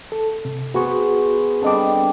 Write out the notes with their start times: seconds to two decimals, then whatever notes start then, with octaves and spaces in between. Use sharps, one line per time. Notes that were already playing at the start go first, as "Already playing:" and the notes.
0.12 A4
0.45 C3
0.74 B3 F#4 G#4 C5 C#6
1.62 D3 G3 C4 D#5 D6